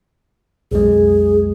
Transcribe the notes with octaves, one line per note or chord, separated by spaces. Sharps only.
B1 F2 G#3 G#4